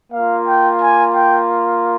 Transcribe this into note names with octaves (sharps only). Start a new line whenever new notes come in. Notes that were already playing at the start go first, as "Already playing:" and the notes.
A#3 F4 F5
G5
G#5
G5